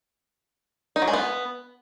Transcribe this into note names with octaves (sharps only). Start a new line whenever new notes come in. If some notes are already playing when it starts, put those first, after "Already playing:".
D#4
F#3
G#3
B3